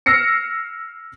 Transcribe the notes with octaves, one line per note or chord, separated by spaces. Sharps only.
E6 F6 A#6 C7 C#7